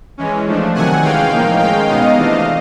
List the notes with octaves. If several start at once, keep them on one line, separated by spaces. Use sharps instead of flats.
E3 G#3 C#4
F3 A3 D4
C3 D#3 F#3 F#5 G#5
E3 G#3 C#4 F5 G5
A2 F3 A#3 D#4
D#3 G#3 C#4 F5 G5
B2 G#3 B3 D#4 D#5 F5
C3 E3 A3 D4